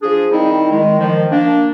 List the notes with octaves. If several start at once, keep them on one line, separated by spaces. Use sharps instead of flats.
F3 D4 G#4
D#3 G3 C4 D#4 E4
D#3 G#3
D#3 F3
A#3 D4